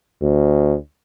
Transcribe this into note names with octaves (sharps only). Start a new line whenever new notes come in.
D2